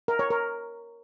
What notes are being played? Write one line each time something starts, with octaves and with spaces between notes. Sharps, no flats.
A#4
C#5
A#4